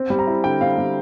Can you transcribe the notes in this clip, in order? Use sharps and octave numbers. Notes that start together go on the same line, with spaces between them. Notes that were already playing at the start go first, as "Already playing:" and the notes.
Already playing: C4
G3
A#5
E4
D3 G5
C4 F5
G3